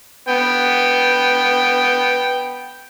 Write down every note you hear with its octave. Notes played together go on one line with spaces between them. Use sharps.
B3 G5